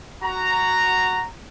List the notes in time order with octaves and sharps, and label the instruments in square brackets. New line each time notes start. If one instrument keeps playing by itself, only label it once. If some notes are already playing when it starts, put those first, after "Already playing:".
[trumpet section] F#4 A#5